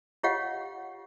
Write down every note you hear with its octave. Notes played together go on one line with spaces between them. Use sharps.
F4 G4 C#5 D#5 F5 F#5